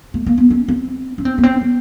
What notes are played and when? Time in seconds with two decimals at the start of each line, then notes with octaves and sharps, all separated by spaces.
0.14 A3
0.26 A#3
0.38 B3
0.50 C#4
0.68 C4
1.18 C#4
1.25 C4
1.38 B3
1.43 C4
1.62 B3